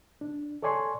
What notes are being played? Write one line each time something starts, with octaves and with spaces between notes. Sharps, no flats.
D4
A4 C#5 D5 G#5 C6 C#6